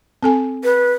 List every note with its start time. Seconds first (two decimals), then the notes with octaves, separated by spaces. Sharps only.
0.23 C4 A4 G#5
0.64 B4